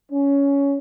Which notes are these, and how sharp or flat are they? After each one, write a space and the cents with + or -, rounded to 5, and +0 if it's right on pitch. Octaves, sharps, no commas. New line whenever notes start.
C#4 +15